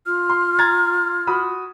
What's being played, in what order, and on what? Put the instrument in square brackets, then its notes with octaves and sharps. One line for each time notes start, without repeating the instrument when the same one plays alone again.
[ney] F4 [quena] F6
[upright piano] C6
A#5 G#6 A6
F#4 B5 D#6